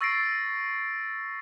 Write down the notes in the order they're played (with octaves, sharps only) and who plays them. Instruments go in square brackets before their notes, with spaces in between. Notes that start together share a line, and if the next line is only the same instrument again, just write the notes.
[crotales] C#6 E6 A6 A#6 C7 D7